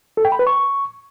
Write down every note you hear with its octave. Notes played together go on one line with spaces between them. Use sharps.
A4
G5
B5
B4
C#6